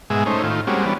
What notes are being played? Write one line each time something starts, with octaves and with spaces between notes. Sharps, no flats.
G#2 B2 G#3 E5 G#5
A3 C#4 D#4 C5
A2 D#3 F4
G3 G#3 A#3 C4 C#4 F#4
E3 G3 B3 C#4 D4